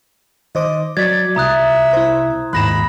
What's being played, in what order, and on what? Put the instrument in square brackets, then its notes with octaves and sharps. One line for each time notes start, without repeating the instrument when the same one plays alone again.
[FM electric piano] D#3 C5 D6 [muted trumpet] D#5
[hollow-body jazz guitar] F#3 [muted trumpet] D5 [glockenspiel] G#6 [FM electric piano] A6 B6
[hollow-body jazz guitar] C2 [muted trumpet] E5 [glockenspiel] A#5 D#6 F#6
[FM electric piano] E4 C5
[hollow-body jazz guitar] D#2 G#2 [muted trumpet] B5 [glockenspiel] F#6 A#6 E7